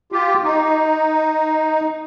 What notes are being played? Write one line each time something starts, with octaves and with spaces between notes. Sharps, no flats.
F4 G4
D#4